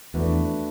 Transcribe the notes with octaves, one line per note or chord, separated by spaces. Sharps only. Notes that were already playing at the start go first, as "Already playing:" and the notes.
E2 A3 D4 F#4 B4